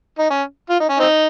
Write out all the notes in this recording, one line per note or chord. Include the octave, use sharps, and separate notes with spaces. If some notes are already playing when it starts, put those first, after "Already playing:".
D#4
C#4
F4
D#4
C#4
C4 D#4